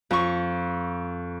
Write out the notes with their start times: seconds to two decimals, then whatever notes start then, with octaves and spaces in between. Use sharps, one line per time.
0.11 F2 C#6